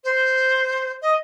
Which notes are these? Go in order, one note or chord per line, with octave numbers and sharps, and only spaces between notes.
C5
D#5